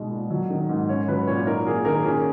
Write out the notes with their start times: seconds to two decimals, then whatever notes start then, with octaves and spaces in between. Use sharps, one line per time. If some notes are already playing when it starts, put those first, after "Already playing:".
Already playing: B2 G#3 D#4
0.11 A#2
0.30 F#3
0.50 D#3
0.69 G#2
0.89 C#4 C#5
1.08 F#3 B4
1.27 A#2 C#5
1.46 D#4 A#4
1.67 A#3 G#4
1.85 D#3 A#4
2.05 C#4 G#4